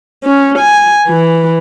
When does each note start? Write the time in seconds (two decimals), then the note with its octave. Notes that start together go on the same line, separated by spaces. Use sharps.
0.24 C#4
0.58 G#5
1.07 E3